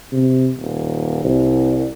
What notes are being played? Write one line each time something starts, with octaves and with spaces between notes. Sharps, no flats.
C3
D#1
C2